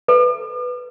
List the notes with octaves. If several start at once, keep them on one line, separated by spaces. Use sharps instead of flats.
A4 B4